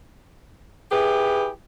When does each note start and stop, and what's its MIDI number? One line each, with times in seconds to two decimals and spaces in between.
0.91 1.48 64
0.91 1.48 67
0.91 1.48 68
0.91 1.48 71